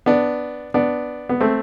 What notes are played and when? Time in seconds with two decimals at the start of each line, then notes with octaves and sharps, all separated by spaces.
0.06 B3 D4
0.74 B3 D4
1.29 B3
1.41 A3 C4